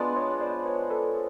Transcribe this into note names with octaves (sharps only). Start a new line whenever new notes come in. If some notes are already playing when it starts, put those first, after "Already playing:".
Already playing: G#3 B3 D4 F4
C#5 D#5
C5 D5
B4 C#5
A4 B4